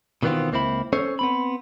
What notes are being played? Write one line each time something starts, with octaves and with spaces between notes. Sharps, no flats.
B2 D#3 E3 B3 C4 F4
C#2 A#3 C4 E4 B5
C#4 A4 C5 C#5
B3 C4 B5